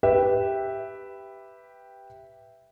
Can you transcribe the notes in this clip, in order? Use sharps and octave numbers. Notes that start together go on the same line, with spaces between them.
G4 B4 E5